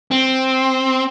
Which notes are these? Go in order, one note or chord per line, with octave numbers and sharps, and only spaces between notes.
C4